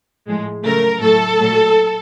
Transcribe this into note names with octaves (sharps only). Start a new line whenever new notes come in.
A2 F3 G#3
C#3 F#3 A3 A#4
A2 F#3 A3 A4
A#2 F#3 A3